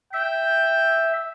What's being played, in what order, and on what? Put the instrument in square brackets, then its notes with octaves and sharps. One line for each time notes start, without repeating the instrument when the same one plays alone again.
[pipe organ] E5 [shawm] G5